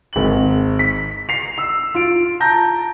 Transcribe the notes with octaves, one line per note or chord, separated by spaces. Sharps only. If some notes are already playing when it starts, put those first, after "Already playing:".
G#1 F#7
B6
C7 F7
E6
F4 D7
A5 A#5 G6 A#6